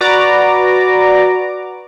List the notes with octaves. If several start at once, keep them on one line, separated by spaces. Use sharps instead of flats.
F#4 B4 D5 A#5 D6